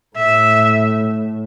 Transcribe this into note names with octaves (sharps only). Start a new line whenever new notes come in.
A2 E5